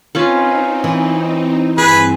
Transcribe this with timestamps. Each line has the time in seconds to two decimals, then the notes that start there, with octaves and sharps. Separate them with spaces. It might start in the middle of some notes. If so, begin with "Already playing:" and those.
0.15 C4 C#4 D#4 F4 B4
0.84 E3
1.78 G2 C4 G#4 B4